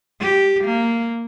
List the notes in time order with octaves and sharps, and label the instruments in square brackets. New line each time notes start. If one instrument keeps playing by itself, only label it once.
[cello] G4
A#3